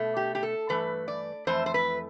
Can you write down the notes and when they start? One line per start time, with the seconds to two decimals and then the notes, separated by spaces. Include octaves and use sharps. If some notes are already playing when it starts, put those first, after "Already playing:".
Already playing: B2 A3
0.17 G4
0.35 G4
0.43 A4
0.69 G2 E3 A3 B4
1.08 D5
1.47 F2 E3 A3 C5
1.66 C5
1.74 B4